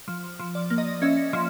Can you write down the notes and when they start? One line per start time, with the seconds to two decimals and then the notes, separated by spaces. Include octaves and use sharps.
0.08 F3
0.39 F3
0.55 D5
0.70 A#3
0.78 D#5
1.02 C#4 E5
1.33 F3